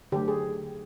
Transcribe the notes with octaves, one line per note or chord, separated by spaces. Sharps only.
D3 F#3 A3 G4
G#4